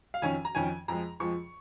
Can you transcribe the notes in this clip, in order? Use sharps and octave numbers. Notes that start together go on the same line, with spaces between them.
F5
F2 D#3 C#4 G#5
A#5
F2 D#3 C#4 G#5
F2 F3 G#3 A#5
F2 F3 G#3 C#6